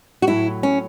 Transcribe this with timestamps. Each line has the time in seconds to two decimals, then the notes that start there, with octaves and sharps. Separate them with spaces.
0.22 F#4
0.27 A2 F#3 E4
0.63 C#4